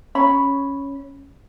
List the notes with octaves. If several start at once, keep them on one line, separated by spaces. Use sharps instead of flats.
C#4 C#5 B5